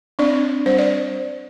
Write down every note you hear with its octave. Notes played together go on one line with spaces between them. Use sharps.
C4 D4 D5
G3 C5
D5